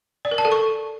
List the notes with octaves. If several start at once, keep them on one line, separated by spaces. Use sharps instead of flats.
D5
A#4
A5
A4
C#6